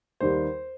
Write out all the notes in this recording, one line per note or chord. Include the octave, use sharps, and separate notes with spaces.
D#2 D#3 G3 C5